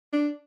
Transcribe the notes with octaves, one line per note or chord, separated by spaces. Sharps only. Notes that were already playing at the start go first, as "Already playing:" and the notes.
D4